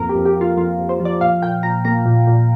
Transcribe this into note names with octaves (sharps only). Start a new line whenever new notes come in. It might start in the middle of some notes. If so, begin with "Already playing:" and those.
Already playing: F2 A#3 A#4
G4
F2
G4
A#3 F4
F2 F4
F2
C5
F3
D5
A#2 F5
A#2 G5
A#2 A#5
A#3 A#5
A#2
A#2